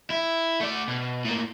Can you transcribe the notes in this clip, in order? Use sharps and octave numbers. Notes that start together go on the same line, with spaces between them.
E4
A3 D5
B2
A2 A#3